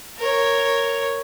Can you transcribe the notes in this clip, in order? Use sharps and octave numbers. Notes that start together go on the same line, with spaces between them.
A#4 C#5